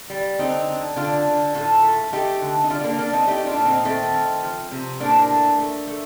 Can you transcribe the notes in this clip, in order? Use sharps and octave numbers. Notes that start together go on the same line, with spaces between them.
G3
D3 C4 D#4
D3
D3 D4 F4
D3
A2 F4 A4
A3
A3 D#4 G4
D3
D#4
G3 D4 F4
A#3 D4
D3 A#3 D4
C4 D#4
A3 D#4 G4
D4 F4
A#2
C4 D#4
D#3 A3 C4
D#3
F3
C3
A2 A#3 D4
A3
A3
A3